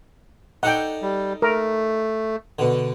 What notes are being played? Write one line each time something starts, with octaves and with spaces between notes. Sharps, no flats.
D#4 A4 D5 F#5 G5
G3
A3 A#4
B2 D3